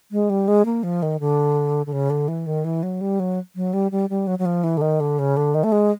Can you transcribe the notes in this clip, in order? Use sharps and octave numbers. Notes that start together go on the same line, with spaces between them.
G#3
G3
G#3
A#3
F3
D#3
D3
D3
C#3
D3
E3
D#3
E3
F#3
G3
F#3
F#3
G3
G3
G3
F#3
F#3
F3
E3
D3
D#3
D3
C#3
D3
D#3
A3
G#3